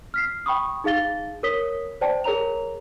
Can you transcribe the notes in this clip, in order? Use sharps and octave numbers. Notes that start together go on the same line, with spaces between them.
F6 B6 C7
G5 B5 C#6 D#6
D#4 G#4 F5 A6 G7
A#4 C#5 D#6 B6 G7
C5 D5 G5 A5
G#4 A#4 C#5 A#5 F7